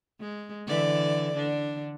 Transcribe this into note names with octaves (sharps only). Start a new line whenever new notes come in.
G#3
D3 E3 D5
D3 D4